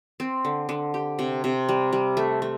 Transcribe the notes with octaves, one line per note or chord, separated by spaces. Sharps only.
C4
D3
D3
G4
C3
C3
G3
G3
A3
A3